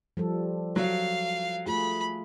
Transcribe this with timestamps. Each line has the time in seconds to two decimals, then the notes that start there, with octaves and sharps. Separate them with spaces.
0.17 F3 G3 A4
0.76 F#3 F5
1.67 A3 F4 G#4 B5